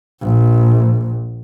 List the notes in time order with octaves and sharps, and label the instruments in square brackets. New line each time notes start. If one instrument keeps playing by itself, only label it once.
[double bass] A#1